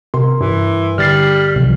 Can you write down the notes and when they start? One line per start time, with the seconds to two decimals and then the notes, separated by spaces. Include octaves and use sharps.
0.14 C3 A#4 C6
0.41 G2 E3
0.98 D3 G3 F6 A6 C7
1.56 C2 C3 F3